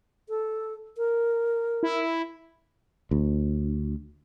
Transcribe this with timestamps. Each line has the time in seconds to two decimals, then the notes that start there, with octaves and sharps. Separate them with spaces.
0.29 A4
0.97 A#4
1.83 E4
3.11 D2